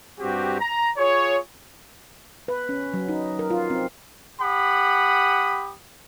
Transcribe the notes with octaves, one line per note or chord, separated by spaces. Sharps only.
G2 C4 F#4 G4
A#5
F4 G#4 C#5
B4
C#4
F#3
D#4
A#4
F4
C4
G4 F#5 B5 D#6